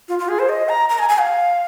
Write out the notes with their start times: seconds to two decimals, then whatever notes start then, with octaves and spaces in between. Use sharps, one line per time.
0.08 F4
0.19 F4
0.28 G#4
0.39 C5
0.49 D#5
0.69 A#5
0.89 A#5
0.99 G#5
1.09 G#5
1.19 F5